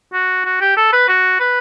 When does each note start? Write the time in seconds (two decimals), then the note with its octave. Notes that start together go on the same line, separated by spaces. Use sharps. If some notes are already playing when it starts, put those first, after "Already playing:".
0.13 F#4
0.45 F#4
0.61 G4
0.77 A4
0.93 B4
1.09 F#4
1.40 B4